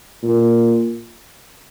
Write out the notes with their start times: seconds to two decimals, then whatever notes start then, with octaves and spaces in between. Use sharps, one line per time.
0.23 A#2